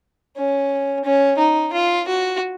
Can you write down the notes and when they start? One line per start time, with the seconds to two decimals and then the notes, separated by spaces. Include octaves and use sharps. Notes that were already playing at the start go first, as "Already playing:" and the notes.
0.36 C#4
1.04 C#4
1.38 D#4
1.73 F4
2.07 F#4